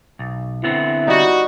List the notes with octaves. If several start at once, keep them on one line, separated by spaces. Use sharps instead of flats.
B1
D3 B3 C4 E4
G3 D#4 F#4